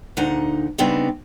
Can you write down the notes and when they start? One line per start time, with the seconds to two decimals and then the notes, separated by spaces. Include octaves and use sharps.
0.17 D2 A#2 D4 D#4 F#5 A#5
0.78 C#3 G3 B3 C4 D4 D#4